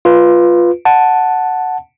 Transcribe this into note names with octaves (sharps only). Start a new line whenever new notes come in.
F4 B4
F#5 A5